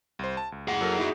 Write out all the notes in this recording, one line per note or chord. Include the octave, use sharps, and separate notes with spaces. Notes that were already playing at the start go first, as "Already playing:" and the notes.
C2 C5
A5
C#2
G#4 F#5
F#3 A4 A#4
D#4 E4 F#4